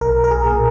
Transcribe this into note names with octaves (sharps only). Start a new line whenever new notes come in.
B1 A#4
A#4
G#4
A#2